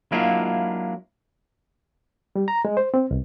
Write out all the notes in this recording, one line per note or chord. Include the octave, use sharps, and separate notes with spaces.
F#3 G#3 A#3 D4 E4 F4
G3
A#5
G#3
C5
C4
C2